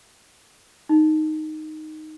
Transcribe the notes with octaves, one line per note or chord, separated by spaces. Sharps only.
D#4